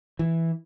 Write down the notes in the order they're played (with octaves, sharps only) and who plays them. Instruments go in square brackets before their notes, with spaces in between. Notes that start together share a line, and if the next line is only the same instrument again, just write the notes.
[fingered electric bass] E3